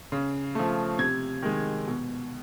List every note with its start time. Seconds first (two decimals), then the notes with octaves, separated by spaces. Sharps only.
0.12 C#3
0.55 F3 A3
0.99 C3 G#6
1.42 D#3 G#3
1.87 B2